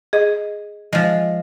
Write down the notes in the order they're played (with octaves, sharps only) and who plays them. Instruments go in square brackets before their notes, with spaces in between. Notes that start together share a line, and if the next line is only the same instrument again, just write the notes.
[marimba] G#4 D#5
[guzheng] F3 G#3